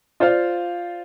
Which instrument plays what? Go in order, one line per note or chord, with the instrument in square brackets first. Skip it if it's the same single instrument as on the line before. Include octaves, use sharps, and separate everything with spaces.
[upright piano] F4 C5 D5 F5